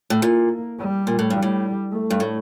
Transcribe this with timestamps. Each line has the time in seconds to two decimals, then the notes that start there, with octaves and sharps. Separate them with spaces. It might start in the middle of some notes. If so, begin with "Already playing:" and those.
0.10 A2
0.22 A#2 A#3
0.79 G3
1.07 A#2
1.19 A2
1.30 G2 G3
1.43 A2
1.92 A3
2.10 G2
2.20 A2